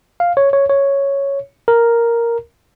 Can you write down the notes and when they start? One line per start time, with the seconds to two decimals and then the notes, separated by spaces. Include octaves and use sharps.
0.20 F5
0.37 C#5
0.53 C#5
0.70 C#5
1.68 A#4